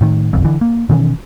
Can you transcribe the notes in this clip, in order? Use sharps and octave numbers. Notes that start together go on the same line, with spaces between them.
A2 D#3
G1 C2 F2
D3 E3
A#3
B2 D#3 E3 C#4